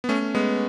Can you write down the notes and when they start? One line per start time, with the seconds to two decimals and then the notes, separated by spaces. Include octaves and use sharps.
0.04 B3
0.09 A3 C#4
0.35 G#3 B3